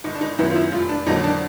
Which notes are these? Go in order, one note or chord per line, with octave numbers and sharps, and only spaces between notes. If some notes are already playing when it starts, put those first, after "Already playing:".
G1 D#4
D4
D#4
F#2 D#3 F#3 B3 E4
F4
E4
F1 F4
D4
F2 D3 F#3 A#3 D#4
D4